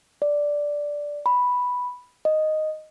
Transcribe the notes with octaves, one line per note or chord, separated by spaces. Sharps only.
D5
B5
D#5